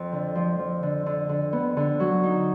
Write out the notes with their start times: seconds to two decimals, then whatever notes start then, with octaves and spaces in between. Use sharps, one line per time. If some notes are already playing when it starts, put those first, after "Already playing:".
Already playing: F2
0.12 D3
0.35 F3
0.59 F3
0.83 D3
1.06 D3
1.29 D3
1.53 B3
1.77 D3
2.00 F#3
2.23 D#4